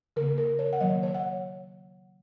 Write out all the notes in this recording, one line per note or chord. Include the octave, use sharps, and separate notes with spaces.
C#3 A#3 A#4
A#4
C#5
F#5
D#3 F#3 A#3 D#5
C#5
F#5